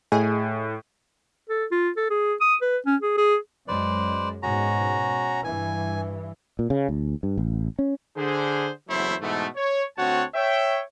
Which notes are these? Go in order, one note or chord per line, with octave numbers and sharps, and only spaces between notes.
A2 G#4 D#5 G#5
A4
F4
A4
G#4
D#6
B4
C#4
G#4
G#4
F#2 G#3 B4 C5 D5
G#2 B2 C#4 F#4 A#5
G2 E3 G#5
A#2
C#3
D2
G2
A1
C#4
D3 G#4 C5
F#1 E2 F#3 A3 E4 C5
G#2 B2 E3 A3
C#5
D2 C4 F#4 C#5 F#5 A5
C#5 E5 G5